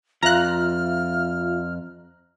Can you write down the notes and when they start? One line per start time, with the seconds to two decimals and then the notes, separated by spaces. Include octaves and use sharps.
0.22 F2 F4 E5 F5 A#5 F6 F#6